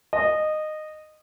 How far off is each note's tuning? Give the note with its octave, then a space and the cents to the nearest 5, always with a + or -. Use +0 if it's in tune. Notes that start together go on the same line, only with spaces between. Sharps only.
D#5 -15